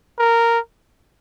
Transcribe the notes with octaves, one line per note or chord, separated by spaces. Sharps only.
A#4